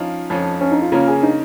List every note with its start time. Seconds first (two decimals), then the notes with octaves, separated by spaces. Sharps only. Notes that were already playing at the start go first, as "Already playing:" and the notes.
Already playing: F3 C#4 D#4 F4
0.30 F2 F3 C#4
0.61 C#4
0.71 D#4
0.82 F4
0.92 C#3 A#3 C#4 F4 A#4
1.08 G#4
1.23 D#4